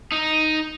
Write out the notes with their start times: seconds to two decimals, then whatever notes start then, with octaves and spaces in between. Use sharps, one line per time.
0.12 D#4